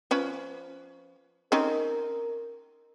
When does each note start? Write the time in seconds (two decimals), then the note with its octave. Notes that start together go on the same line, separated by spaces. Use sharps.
0.11 F3 C#4 B4
1.52 C4 C#4 D#4 A#4